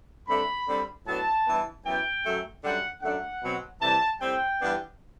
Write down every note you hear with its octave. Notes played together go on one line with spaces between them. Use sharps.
G2 D3 A3 C4 B5
D3 G3 C4
A2 F#3 B3 D4 A5
G2 E3 B3
F#2 E3 B3 G5
F#2 F#3 A3
F#2 D3 G3 D4 F#5
F#2 D3 A3 D4 F#5
B2 F#3 C4
C3 E3 G3 A5
A2 G3 C4 G5
G2 E3 B3 D4